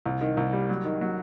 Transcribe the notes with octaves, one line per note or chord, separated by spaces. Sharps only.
C2
D#3
C2
G3
F#3
D#3
F#3